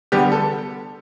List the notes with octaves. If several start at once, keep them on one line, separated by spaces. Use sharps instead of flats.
D3 G3 B3 G4
A4